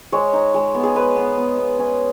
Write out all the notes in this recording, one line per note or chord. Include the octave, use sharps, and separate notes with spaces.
G#3 C#5
D#4
G#3
B3
G#4
G#3 B4
B3
B3
B3
C#4